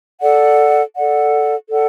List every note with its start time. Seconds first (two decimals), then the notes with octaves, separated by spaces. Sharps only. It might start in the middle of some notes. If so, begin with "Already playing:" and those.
0.20 A4 D5 F#5
0.95 A4 D5 F#5
1.70 A4 D5 F#5